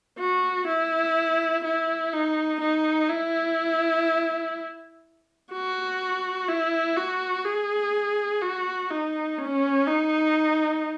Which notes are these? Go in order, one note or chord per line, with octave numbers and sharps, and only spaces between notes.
F#4
E4
E4
D#4
D#4
E4
F#4
E4
F#4
G#4
F#4
D#4
C#4
D#4